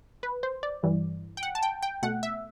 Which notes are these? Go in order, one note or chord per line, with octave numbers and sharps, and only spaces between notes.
B4
C5
D5
G2 E3 G3
G5
F#5
A5
G5
G5
B2 A3 F#5
E5